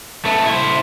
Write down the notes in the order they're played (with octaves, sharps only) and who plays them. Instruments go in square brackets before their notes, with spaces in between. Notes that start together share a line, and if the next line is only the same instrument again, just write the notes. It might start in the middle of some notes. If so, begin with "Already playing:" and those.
[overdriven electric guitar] A3 B3
E4 C5